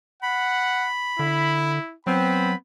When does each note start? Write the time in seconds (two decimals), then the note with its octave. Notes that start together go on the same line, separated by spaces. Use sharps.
0.23 F#5 B5
1.19 D3 E4
2.07 F#3 B3 C4 B5